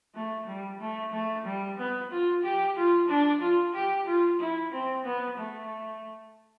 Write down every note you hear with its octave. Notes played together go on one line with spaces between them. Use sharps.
A3
G3
A3
A3
G3
B3
F4
G4
F4
D4
F4
G4
F4
E4
C4
B3
A3